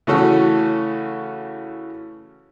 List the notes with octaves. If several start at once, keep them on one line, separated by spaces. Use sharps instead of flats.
C#3 E3 A3 C#4 F#4 A4